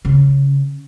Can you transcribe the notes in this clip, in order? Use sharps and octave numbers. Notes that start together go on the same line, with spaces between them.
C#3